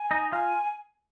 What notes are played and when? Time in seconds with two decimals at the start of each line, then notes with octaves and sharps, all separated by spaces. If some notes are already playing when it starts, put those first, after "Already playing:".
Already playing: G#5
0.11 D#4 D#5
0.32 F4 F5 G#5